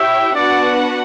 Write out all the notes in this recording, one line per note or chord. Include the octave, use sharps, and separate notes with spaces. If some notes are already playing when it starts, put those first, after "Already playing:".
Already playing: E4 G4 C#5 E5 G5
B3 D4 F#4 B4 D5 F#5